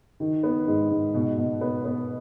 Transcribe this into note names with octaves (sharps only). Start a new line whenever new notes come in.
D#3
B3
G#2
G#2
B2
B2
B3
B3